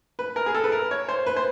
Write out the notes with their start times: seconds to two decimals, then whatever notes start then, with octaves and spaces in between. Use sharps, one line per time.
0.19 B4
0.36 A#4
0.46 G#4
0.55 A4
0.64 B4
0.72 A#4
0.91 C#5
1.08 C5
1.26 B4
1.36 C5